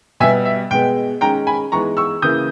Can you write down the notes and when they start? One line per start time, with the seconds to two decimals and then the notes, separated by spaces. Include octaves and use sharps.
0.20 B2 G3 B3 E5 G#5
0.45 E5
0.71 B2 G#3 B3 G5
1.21 D#3 G#3 C#4 G5 A#5
1.47 G#5 B5
1.72 E3 G#3 B3 D#4 A#5 C#6
1.97 C#6 E6
2.22 C#3 E3 A#3 D#6 G6